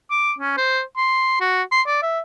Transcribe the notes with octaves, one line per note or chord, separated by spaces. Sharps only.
D6
C#4
C5
C6
F#4
C6
D5
E5